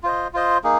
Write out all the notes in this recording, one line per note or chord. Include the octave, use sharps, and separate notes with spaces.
F4 C5 D#5
F4 C5 D#5
A#3 D#4 G#4